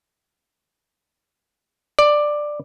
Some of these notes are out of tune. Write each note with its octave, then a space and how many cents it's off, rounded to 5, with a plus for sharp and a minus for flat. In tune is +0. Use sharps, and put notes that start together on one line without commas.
D5 +10